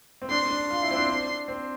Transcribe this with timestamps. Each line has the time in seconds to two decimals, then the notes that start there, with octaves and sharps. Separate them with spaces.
0.22 C4
0.30 D4 C6
0.50 D4
0.70 F4
0.83 E4
0.91 C4
0.96 D4
1.09 D4
1.48 C4